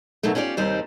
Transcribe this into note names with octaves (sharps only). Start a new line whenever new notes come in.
G#2 B2 D#3 F#3 A3
C#4 E4 F4 G4 D5
D#2 C3 G3 D#4 C5